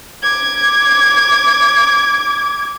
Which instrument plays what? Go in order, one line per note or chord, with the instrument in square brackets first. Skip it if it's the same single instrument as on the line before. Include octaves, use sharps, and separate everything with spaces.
[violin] D6 G#6